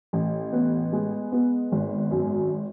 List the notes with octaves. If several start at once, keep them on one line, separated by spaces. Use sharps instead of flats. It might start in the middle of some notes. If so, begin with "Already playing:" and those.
A1
B3
G#3
B3
G#1
F#2